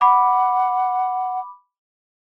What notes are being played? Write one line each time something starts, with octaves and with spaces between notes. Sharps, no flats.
F#5 B5 D6